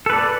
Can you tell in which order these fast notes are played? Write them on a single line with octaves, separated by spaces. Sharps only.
A4 B4 D5